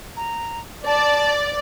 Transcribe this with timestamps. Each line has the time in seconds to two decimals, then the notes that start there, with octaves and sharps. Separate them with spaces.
0.16 A#5
0.86 D5 A5